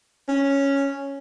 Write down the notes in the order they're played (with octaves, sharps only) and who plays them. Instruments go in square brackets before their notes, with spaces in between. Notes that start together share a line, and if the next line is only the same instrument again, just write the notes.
[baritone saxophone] C#4